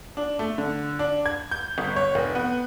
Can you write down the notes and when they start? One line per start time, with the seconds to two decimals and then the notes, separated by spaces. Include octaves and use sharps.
0.17 D4
0.39 A3
0.58 D3
0.99 D4
1.26 G#6
1.51 G6
1.78 G1
1.96 C#5
2.15 F1
2.35 B3